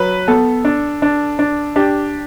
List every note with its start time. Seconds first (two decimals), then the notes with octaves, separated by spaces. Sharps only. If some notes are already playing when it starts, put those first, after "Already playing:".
Already playing: F#3 B4
0.28 B3 A4
0.65 D4
1.02 D4
1.39 D4
1.76 D4 G4